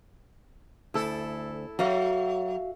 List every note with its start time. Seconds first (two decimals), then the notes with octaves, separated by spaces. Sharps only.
0.94 D2 E4 A4
1.79 F#3 F#4 E5 F5